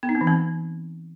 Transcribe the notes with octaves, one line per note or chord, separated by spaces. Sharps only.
B3
D#4
C4
E3
C4